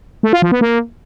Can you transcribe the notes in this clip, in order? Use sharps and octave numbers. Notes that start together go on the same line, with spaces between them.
A3
F4
F3
B3
A#3